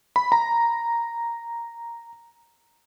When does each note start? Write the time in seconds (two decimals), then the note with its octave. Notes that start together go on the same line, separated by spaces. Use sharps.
0.16 B5
0.32 A#5